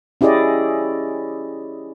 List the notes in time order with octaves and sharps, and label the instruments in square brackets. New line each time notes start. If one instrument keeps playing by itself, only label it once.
[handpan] C#4 E4 G4 G#4 D5 D#5